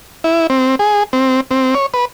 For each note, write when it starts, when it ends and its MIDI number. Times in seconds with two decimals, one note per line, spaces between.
0.24 0.47 64
0.50 0.75 60
0.79 1.03 68
1.13 1.41 60
1.51 1.74 60
1.75 1.86 73
1.94 2.05 71